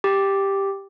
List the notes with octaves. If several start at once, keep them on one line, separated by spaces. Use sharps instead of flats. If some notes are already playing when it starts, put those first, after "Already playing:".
G4